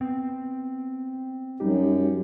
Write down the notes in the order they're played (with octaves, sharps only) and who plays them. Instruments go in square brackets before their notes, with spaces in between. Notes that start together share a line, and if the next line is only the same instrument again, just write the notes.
[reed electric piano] B3 [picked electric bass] C4
[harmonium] F#2 [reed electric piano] G3 D#4 G4